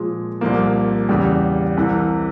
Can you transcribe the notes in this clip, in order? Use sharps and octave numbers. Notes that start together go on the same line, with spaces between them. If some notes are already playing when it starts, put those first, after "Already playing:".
Already playing: A#2 F3 G#3
C2 A#2 F3 A#3
E2 C#3 G3
C2 C3 E3